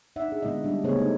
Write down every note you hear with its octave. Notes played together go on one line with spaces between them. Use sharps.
D#4 D5 E5 F#5
D4 G#4
A#2 D3 G#3 B3 E4 D#5
G3 G#3 D4
C#3 A3 B3 G#4 C5 C#5
D#4